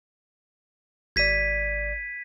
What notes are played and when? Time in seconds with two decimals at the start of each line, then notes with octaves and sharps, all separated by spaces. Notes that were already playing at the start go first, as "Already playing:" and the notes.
1.16 G#1 D5 G#6 B6 D#7